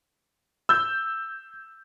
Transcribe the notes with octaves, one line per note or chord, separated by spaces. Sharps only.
E6 G6